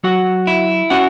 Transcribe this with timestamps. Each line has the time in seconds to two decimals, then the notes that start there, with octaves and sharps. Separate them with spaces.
0.04 F#3 F#4 F#5
0.47 E4
0.90 C#4 F#4 F#5